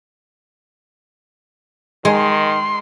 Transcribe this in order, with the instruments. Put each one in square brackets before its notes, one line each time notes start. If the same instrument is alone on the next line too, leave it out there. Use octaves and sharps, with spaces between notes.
[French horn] D#3 [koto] G#3 [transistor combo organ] C6